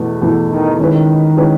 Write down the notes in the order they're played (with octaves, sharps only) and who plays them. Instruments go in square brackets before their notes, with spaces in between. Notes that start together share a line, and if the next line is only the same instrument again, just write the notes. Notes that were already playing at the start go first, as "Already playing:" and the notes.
Already playing: [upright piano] E2 B2 A3 E4
E2 B2 A3 E4
[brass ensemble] D#3
[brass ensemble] D#3 [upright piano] G#3 C#4 E4 B4
[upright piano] G#3 C#4 E4 B4